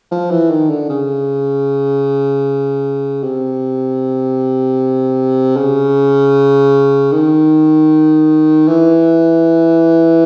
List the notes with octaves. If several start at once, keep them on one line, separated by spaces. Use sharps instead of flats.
F3
E3
D#3
D3
C#3
C3
C#3
D#3
E3